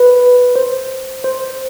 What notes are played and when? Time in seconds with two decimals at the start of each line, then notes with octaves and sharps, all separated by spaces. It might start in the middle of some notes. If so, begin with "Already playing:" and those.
Already playing: B4
0.55 C5
1.24 C5